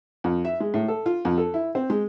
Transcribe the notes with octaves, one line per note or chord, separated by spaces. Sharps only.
F2
E5
G#3
A2
A4
F4
F2
A4
E4
C4
G#3